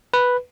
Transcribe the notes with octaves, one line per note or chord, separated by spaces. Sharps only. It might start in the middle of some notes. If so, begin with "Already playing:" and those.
B4